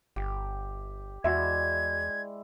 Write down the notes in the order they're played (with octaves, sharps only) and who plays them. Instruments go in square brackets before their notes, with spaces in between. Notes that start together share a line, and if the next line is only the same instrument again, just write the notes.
[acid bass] G1 [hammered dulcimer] G4
[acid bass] E2 [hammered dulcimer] G#3 E4 D5 [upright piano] F#4 E5 [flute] G#6